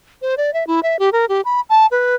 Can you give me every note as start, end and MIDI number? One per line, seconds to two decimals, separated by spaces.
0.22 0.35 72
0.37 0.53 74
0.54 0.67 76
0.67 0.80 64
0.83 0.99 76
0.99 1.09 67
1.13 1.25 70
1.29 1.41 67
1.45 1.61 83
1.70 1.86 81
1.91 2.15 71